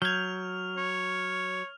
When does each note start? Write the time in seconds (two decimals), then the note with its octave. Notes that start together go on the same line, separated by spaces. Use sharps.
0.02 F#3 F6 G6 G#6 F7
0.77 C#5